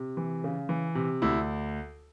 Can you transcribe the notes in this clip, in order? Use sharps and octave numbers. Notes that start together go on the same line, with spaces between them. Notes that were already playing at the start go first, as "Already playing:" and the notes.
Already playing: C3
E3
C#3
E3
C3
D2 E4